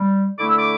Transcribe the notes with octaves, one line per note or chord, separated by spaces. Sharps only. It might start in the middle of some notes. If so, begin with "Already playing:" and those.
Already playing: G3
D3 A3 E4 D6
E6
D6